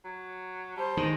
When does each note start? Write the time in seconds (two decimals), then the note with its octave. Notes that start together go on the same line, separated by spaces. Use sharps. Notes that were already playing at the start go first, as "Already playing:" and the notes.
0.05 F#3
0.77 G3 C5 A5
0.97 D#3 G#3